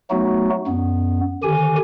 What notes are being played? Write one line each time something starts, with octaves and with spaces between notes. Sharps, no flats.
F#3 A3 B3 D#4 F#4
F#2 B3
D3 D#3 G4 G#5